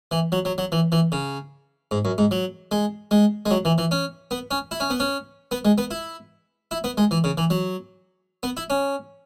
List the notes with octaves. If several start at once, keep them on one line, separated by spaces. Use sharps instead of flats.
E3
F#3
F#3
F#3
E3
E3
C#3
G#2
F#2
G#2
F#3
G#3
G#3
G#3
F#3
E3
E3
C#4
B3
C#4
E4
C#4
B3
C#4
B3
G#3
B3
E4
E4
B3
G#3
E3
C#3
E3
F#3
B3
E4
C#4